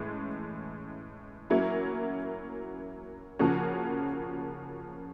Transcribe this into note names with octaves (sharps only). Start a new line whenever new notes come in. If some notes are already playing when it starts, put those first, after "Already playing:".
Already playing: A2 E3 G#3 C#4
F#3 A#3 C#4 E4
C#3 F3 A#3 C#4 F#4